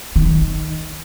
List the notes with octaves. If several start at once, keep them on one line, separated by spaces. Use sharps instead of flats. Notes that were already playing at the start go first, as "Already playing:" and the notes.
D#3